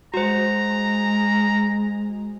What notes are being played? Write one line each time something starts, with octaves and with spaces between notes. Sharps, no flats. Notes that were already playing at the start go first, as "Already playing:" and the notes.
G#3 F#4 C5 A#5